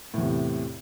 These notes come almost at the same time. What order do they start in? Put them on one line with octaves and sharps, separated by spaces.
A2 E2 C3